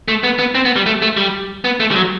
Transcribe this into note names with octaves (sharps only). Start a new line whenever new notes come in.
A3
B3
B3
C4
B3
G3
A3
A3
G3
B3
A3
G3
F#3